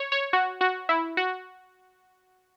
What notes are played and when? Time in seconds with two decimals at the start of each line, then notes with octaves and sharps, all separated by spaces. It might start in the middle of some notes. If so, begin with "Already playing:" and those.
Already playing: C#5
0.12 C#5
0.33 F#4
0.61 F#4
0.89 E4
1.17 F#4